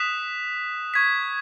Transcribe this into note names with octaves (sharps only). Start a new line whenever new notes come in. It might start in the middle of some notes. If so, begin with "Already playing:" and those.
Already playing: D#6 F#6 B6 E7
C#6 G#6 B6